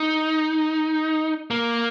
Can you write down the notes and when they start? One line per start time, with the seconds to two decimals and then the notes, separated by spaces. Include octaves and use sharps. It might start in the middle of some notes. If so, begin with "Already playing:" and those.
Already playing: D#4
1.51 A#3